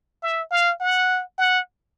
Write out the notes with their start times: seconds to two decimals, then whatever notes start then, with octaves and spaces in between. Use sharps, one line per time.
0.23 E5
0.51 F5
0.81 F#5
1.38 F#5